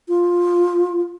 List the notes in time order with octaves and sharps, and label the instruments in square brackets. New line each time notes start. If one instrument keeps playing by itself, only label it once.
[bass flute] F4